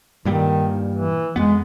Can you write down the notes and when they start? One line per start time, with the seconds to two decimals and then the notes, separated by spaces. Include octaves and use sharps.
0.25 G2 A#2 D#3 G3
0.94 E3
1.36 F2 G#3 B3